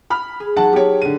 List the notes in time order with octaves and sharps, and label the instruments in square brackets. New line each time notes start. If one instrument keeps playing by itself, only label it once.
[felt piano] B5 F6
[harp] G#4
[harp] F#3 D#4 [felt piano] F#5 A5
[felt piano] G4 C#5
D3 D#7